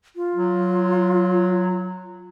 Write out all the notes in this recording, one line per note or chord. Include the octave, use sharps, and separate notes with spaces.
F4
F#3